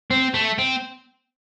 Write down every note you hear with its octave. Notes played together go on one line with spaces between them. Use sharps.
C4
A3
C4